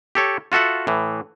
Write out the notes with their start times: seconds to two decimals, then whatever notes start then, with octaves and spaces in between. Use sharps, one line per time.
0.15 G4 A4 C#5
0.52 F4 F#4 A4 E5 F#5
0.87 A2 E3